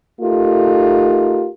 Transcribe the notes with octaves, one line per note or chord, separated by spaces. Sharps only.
A3 D#4 F4 G4 A#4